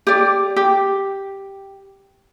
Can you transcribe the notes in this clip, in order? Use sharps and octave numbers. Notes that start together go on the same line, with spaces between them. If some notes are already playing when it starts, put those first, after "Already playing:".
G4 D5
G4